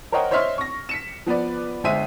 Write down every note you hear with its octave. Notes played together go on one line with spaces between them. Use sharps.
A#4 C5 C#5 D#5 F#5 G5
C5 C#5 D#5 E5 C6 F6
C#6 A#6
B6 C#7 E7
F3 B3 B4 D5
G1 G#3 C5 E5 D#7